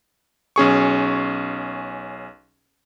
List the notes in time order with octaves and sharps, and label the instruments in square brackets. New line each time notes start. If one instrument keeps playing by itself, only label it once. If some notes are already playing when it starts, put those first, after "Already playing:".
[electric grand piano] B1 C#4 G#4 C#6